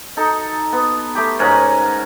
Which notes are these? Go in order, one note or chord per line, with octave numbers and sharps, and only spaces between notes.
D#4 A4
B3
A3 G4
G#2 C#4 A#4 F#5